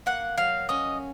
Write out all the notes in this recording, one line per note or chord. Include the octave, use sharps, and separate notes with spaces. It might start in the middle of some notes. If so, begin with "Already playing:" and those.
A#3 F#5
F#3 F5
C#4 D#5